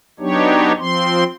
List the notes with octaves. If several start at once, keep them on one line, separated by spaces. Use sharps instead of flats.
F#3 B3 D4 D#4 G4 C#5
F3 C4 C6